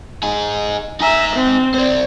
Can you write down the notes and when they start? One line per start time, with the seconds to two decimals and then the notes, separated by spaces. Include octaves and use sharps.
0.23 D#4 G#4
1.01 D#4 E5 G#5 A#5
1.36 C4
1.74 C5 D5